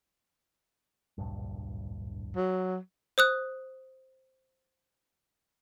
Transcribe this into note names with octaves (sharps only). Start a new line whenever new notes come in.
D1 A#1 G2
F#3
C5 D#6 F#6